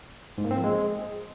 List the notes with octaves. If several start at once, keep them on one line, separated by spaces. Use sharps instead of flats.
G#2
A#3
C4
F3
G#3